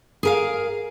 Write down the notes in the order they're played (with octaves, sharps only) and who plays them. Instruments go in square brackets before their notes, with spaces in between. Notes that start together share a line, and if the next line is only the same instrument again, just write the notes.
[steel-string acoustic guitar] G#4 A#4 F5